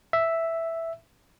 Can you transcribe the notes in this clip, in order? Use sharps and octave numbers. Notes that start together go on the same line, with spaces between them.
E5